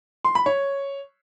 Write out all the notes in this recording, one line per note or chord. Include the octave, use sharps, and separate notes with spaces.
C6
B5
C#5